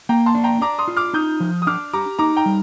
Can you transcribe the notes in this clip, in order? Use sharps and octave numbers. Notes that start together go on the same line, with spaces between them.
A#3 G5 A#5
A5 C6
D4
G5 A#5
D4 A#5 D6
C6 D#6
F4
D6 F6
D#4 D#6 G6
F3
D#6
D4 D6 F6
G4 A#5 D6
D#4 A#5 D6
G5 A#5
G3